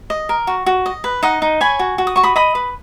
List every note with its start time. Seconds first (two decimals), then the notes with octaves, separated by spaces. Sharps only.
0.10 D#5
0.29 A#4
0.47 F#4
0.66 F#4
0.86 D#5
1.04 B4
1.23 D#4 D#5 F#5
1.42 D#4
1.61 C#5 G#5 B5
1.79 F#4
1.98 F#4
2.07 D#6
2.16 F#4 C#6
2.23 B5 D#6
2.36 D#5 B5 D#6
2.55 B4